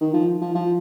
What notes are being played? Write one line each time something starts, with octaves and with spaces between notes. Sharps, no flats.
D#3
F3
F3
F3